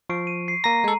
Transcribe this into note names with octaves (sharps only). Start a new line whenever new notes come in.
F3 C#6 C7 D7
D#7
C7
A#3 A#5 A#6 D#7
G#3 A4